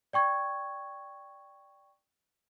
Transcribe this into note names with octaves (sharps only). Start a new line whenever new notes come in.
D5 G5 C#6 G#6